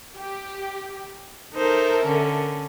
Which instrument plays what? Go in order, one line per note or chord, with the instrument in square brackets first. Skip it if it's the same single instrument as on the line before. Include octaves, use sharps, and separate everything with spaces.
[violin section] G4
[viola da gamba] D#4 C5 [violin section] A4 A#4 E5
[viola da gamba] D3 C#4